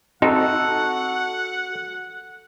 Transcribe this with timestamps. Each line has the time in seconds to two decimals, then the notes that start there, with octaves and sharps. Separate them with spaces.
0.22 C4 D#4 F#4 A4 F#5